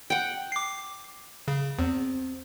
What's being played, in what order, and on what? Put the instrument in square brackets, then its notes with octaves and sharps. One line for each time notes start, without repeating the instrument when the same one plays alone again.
[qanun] F#5 G5
[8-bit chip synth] D6 C7
C#3
[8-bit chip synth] E2 [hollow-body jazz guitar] C4